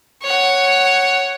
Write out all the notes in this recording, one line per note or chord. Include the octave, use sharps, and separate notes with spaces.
C#5 F#5